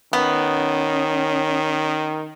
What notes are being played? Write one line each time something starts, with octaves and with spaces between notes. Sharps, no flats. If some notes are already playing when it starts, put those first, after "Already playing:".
D#3 B3 C#4